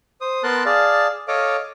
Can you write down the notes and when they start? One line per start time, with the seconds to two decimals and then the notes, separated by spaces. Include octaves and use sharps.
0.21 C5 D#6
0.43 B3 A#4 A5 C6 F#6
0.66 G#4 D5 F5 A5
1.28 A4 C#5 D#5 F5 D6